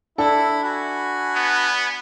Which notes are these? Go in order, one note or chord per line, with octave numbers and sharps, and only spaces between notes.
D4 E4 A4
F#4 G#5 B5
B3